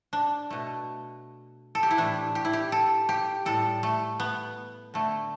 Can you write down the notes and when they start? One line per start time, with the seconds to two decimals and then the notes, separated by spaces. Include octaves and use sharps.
0.13 D4
0.50 B2 A3
1.75 A4
1.83 G4
1.91 E4
1.97 A2 E3 A3 D4
2.35 G4
2.45 E4
2.53 G4
2.72 A4
3.09 G4
3.46 A2 G3 A4
3.83 A3
4.20 B3
4.94 D3 A3